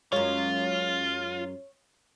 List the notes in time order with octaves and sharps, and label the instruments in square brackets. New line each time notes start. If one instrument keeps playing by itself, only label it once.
[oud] F#2 G#3 [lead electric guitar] F4 [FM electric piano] C#5